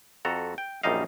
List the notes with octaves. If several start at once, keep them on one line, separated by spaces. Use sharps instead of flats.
F2 F#4 A4 A#5
G5
A#1 F#2 G3 D#4 D#5 F5